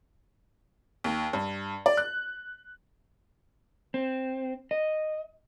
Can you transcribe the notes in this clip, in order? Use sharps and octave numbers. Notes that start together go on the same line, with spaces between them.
D#2
G2
D5
F#6
C4
D#5